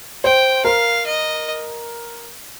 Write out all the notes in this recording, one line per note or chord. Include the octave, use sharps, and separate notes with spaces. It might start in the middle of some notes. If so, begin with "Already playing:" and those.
C5 G5
A#4 F5
D#5